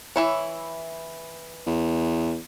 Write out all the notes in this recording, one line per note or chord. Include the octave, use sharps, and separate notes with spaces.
E3 E4 C#5
E2